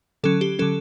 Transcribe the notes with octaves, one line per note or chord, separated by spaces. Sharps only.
D3 F#3 C#4 A4
G4
D3 F#3 C#4 A4